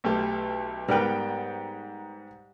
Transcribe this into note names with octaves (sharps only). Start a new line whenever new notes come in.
B1 A3 G4
G#2 G3 B3 A#4 B4 G5